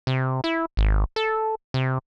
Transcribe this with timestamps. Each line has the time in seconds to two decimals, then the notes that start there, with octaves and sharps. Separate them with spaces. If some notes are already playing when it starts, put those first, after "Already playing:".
0.07 C3
0.44 E4
0.77 G#1
1.16 A4
1.74 C3